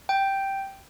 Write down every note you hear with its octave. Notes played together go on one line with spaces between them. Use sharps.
G5